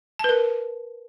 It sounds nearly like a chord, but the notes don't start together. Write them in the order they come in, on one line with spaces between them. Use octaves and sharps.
A5 B4 A#4